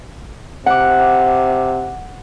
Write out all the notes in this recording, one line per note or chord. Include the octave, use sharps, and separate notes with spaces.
C3 F#5 D6